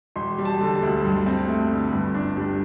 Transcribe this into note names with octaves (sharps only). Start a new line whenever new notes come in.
E1 C6
G3
A5
D3
A5
D2
G2 C6
C4
A3
D3
G1
D4
G3